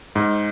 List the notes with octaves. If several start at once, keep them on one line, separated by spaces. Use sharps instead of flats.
G#2